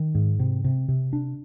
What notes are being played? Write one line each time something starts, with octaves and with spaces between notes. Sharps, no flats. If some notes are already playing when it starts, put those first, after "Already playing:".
Already playing: D#3
G#2
C3
C3
C3
D4